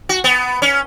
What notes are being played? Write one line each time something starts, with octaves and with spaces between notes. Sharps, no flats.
F#4
B3
C#4